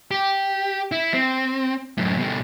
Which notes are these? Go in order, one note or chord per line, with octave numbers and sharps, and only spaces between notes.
G4
E4
C4
F#2 A2
B2 G3